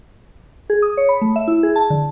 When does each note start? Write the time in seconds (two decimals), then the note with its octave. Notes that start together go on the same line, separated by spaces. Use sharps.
0.70 G#4
0.82 D#6
0.97 C#5
1.09 B5
1.22 A3
1.36 E5
1.48 E4
1.63 G#4
1.76 A5
1.90 D3